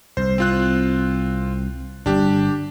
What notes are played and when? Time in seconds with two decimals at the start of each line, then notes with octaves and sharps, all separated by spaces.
0.17 C2 C5
0.38 C4 F4 F#6
2.06 G1 G3 D4 G4